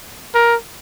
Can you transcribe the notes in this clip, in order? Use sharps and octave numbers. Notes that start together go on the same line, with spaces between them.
A#4